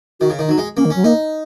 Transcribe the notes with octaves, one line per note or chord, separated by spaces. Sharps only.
D#3 F#4
C#3
D#3
F#3 D#4
G#3
A#3 C#4
D#3
F#3 C#4
A#3 D#4